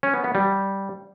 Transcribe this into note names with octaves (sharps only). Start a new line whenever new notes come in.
C#4
B3
B3
G3